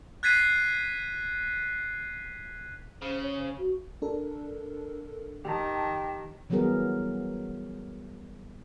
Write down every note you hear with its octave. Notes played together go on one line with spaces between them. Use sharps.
F#6 G#6 A6 B6 C7 D#7
C#3 C5
C#5
C5
F#4
D4 A4 A#4
D#3 G4 G5 A5
E3 F#3 G3 B3 G#4 A#4